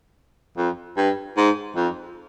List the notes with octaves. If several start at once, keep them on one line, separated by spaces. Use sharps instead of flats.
F2
G2
G#2
F2